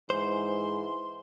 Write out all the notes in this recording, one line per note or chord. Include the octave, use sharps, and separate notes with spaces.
G#2 E3 C5 C6